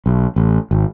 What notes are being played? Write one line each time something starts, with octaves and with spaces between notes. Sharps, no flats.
B1
A1
G#1